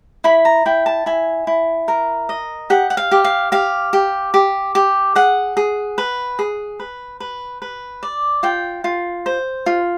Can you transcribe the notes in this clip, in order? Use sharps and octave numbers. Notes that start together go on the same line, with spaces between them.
E4 B5
A#5
E4 G5
A5
E4 G#5
E4
A#4
D#5
G4 F#5
F#5
F5
G4
F5
G4 F5
G4
G4
G4
G#4 F#5
G#4
B4
G#4
B4
B4
B4
D5
F4 G5
F4
C5
F4